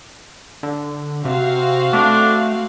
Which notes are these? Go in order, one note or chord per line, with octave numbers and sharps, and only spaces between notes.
D3
C3 C4 F#4 F5
A3 D4